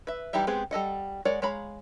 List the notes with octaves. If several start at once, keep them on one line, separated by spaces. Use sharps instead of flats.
B4 E5
E3 G3 D#4 G4 E5
G#3 B3 C4 G4 G#4
G3 A4 D#5 F#5
G#3 A#4 C#5 D5 F#5
G#3 C#5 F5 A#5 B5